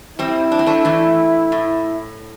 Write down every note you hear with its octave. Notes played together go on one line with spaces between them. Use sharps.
G3 C4 E4
D4
C4
A3 D4
E3 A3
A2